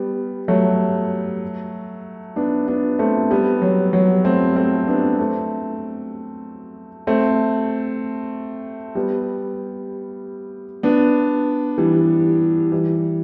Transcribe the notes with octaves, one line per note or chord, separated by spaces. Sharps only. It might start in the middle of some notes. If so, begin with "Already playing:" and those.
Already playing: G3 B3
F#3 A3
B3 D4
B3 D4
A3 C4
G3 B3
F#3
F#3
A3 C4
A3 C4
B3 D4
A3 C4
A3 C4
G3 B3
B3 D4
E3 G3
E3 G3